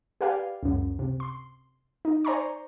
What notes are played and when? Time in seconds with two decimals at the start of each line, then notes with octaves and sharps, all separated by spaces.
0.21 G4 B4 D5 F5 G5 G#5
0.63 C#2 F#2
0.99 C3
1.20 C6
2.05 D#4
2.25 C5 D5 G#5 A#5 C6 C#6